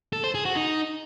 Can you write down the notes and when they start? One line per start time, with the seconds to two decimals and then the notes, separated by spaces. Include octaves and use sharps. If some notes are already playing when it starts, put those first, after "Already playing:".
0.13 A4
0.24 C5
0.35 G#4
0.45 F#4
0.56 D#4